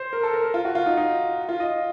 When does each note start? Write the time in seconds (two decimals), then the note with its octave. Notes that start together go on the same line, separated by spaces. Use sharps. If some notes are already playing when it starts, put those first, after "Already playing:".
Already playing: C5
0.13 A#4
0.23 A4
0.34 A#4
0.44 A#4
0.54 F4
0.65 F#4
0.75 F4
0.86 D#4
0.97 D#4
1.49 F4
1.60 D#5